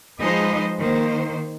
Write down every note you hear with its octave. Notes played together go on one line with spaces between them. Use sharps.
F3 G#3 D#4 B4 C5 D#5
D#3 A#3 C5